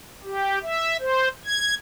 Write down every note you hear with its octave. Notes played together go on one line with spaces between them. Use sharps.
G4
E5
C5
G#6